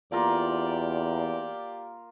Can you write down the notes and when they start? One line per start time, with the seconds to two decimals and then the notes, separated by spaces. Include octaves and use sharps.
0.12 E2 A#3 F4 G4 A#4 D5